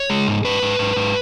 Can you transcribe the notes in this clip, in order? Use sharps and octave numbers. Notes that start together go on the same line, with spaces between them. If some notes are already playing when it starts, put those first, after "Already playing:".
Already playing: C#5
G#3
G#2
G#2 B4
G#2
G#2
G#2